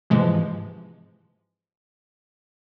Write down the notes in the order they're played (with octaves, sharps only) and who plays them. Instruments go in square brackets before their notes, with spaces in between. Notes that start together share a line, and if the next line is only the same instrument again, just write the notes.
[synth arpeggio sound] G#2 C3 E3 F3 G#3